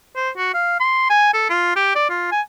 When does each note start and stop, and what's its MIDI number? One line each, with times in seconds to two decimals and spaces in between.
0.16 0.30 72
0.37 0.51 66
0.54 0.80 77
0.80 1.05 84
1.10 1.33 80
1.34 1.45 69
1.50 1.76 65
1.76 1.94 67
1.95 2.08 74
2.10 2.27 65
2.32 2.41 80